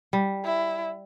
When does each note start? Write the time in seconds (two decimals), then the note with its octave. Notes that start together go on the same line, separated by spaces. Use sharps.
0.13 G3
0.45 E4